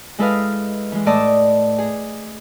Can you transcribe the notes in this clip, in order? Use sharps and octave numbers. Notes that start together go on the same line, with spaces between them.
G#3 E4 A4 B4 D#5 F5
E3 G#3
A2 D5 D#5 A5 D6 E6
G#4